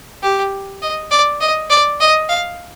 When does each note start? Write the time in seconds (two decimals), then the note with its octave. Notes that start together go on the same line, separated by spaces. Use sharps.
0.23 G4
0.82 D#5
1.11 D5
1.41 D#5
1.70 D5
2.01 D#5
2.29 F5